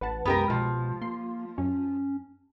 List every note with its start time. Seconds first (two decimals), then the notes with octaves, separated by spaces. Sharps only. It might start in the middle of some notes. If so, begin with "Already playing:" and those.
0.01 A1 B4 F#5 A5
0.25 C2 F#2 G#3 B3 G4 A#4
0.50 B2 F3
1.02 A#3 C6
1.58 F#2 C#4